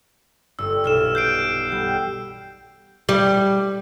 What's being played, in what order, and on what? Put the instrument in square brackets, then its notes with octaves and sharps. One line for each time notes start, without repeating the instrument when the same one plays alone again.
[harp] G1 [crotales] E6
[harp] B1 [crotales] E6 F6 E7
[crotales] G6 C7 D7
[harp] G3 F#5
[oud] G3